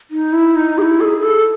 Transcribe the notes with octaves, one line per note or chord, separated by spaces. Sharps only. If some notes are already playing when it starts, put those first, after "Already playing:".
D#4
E4
D#4
G#4
E4
A4
G#4
A4